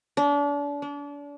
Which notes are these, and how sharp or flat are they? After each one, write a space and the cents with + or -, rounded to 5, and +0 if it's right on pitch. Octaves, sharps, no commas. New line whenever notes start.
D4 -35
D4 -35